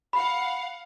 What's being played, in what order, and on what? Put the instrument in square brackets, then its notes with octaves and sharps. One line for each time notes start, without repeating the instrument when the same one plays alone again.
[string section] F5 F#5 [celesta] B5